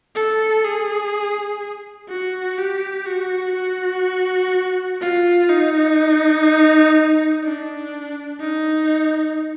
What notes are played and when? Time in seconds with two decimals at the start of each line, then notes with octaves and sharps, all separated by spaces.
0.16 A4
0.64 G#4
2.09 F#4
2.58 G4
3.06 F#4
3.56 F#4
5.01 F4
5.49 D#4
7.44 D4
8.40 D#4